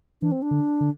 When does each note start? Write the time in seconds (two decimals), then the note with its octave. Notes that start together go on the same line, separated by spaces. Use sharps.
0.22 E3 D4
0.32 C4
0.42 D4
0.51 D3
0.81 D3